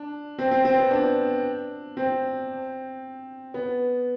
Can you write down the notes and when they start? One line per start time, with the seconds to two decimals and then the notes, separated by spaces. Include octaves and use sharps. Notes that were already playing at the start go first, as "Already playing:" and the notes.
Already playing: D4
0.39 C4
0.51 C4
0.65 C4
0.78 B3
0.91 D4
1.97 C4
3.54 B3